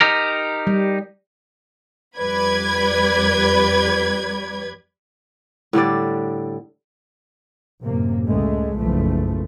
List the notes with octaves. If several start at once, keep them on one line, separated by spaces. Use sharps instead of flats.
D#4 G4 A#4
G3
F2 G3 B4 D5 B5 G#6
A2 D3 G3 D5
F#2 A2 C3 A#3
C#2 G#3 A3
F#1 B1 B2 F3 A3